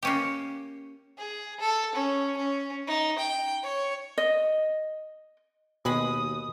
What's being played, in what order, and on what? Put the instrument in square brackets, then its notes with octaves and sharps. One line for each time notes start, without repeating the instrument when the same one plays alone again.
[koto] A#3 C#4 G4
[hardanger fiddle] G#4
A4
C#4
C#4
D#4
G5
C#5
[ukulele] D#5
[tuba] D#2 [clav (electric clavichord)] B2 [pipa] G#3 G#4 B5 [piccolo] D#6